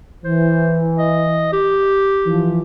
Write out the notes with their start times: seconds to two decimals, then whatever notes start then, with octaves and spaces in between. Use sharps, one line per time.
0.24 E3 C5
0.98 D#5
1.52 G4
2.26 E3 F3